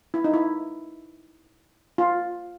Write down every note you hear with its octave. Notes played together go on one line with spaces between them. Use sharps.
E4
D#4
E4
F4